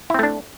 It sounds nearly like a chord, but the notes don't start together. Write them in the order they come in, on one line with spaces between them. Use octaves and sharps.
E4 C4 A3 D4